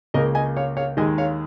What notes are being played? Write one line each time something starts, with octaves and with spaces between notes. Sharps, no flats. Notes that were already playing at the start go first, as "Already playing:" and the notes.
C#2 C#3 A#3 A#4 D#5
D#5 G#5
C#5 F5
C#5 F5
D#2 D#3 G#3 D#5 G#5
C#5 F5